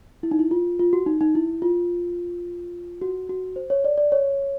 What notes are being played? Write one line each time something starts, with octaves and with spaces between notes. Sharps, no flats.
E4
D#4
E4
F4
F4
F#4
D#4
D#4
E4
F4
F#4
F#4
C5
C#5
D5
D5
C#5